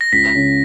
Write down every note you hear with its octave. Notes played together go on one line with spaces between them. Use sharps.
A#6
C#2 B6
C#3